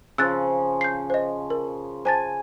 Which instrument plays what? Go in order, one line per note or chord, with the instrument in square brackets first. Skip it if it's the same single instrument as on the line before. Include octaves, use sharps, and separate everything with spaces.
[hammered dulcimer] C#3 F3 [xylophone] E6 F#6 A6
[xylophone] G6 C7
C5 D#5
A#4
[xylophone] C5 A5 A6 [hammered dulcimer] G#5